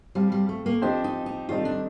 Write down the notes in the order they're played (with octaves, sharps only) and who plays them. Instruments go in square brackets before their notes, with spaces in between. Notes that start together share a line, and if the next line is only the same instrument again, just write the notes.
[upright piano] F3 C4 F4 [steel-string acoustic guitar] G3
[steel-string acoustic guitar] G3
A3
A#3
[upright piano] F3 C4 G4 C5 D#5 [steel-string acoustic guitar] D4
[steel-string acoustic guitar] D#4
D#4
[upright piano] D#3 G3 C4 D#4 A4 [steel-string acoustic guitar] F4
[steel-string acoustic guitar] D4